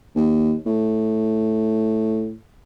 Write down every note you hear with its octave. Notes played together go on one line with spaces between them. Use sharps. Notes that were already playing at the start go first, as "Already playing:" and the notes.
D#2
A2